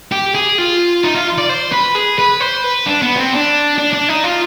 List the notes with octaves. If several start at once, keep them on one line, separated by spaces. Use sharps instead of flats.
G4
G#4
F4
D#4
F4
D5
C5
B4
G#4
B4
C5
B4
D4
B3
C4
D4
D4
D4
D#4
F4